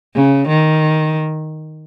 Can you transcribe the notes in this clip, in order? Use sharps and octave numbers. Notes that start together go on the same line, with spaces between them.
C#3
D#3